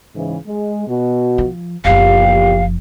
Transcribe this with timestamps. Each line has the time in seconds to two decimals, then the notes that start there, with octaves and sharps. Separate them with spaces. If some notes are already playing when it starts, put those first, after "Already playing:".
0.15 G#2 C#3 E3
0.46 G#3
0.87 B2 F#4
1.38 F3
1.85 F#1 E2 A#2 F3 G4 F5